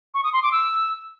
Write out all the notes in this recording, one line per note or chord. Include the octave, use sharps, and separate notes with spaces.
C#6
D#6
C6
D6
E6